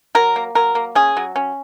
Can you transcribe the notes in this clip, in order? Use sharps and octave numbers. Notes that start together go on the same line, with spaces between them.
F#3 A#4
A#3
F#3 A#4
A#3
C#4 G#4
F#3
C#4